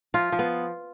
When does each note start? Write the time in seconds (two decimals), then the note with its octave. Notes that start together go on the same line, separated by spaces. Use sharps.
0.14 F3 F4
0.32 F3
0.39 B3